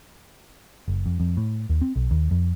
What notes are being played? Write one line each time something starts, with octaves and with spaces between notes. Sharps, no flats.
F#1
F2
F2
A2
D#2
C4
B1
D#2
F2